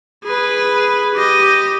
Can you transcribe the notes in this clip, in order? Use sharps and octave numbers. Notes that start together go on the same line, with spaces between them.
G#4 B4
G4 D#5